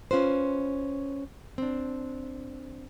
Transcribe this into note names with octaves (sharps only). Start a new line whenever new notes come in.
C#4 F4 B4 C5
C4 D4